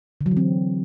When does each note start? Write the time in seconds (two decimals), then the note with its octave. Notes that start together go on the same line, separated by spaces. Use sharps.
0.21 D3
0.26 F#3
0.31 E3
0.37 C4